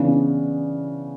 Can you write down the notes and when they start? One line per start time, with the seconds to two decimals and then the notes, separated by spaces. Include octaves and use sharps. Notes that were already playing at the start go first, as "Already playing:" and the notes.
Already playing: C#3 E3 B3 D4